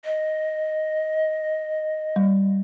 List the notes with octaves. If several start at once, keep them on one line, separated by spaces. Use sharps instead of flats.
D#5
G3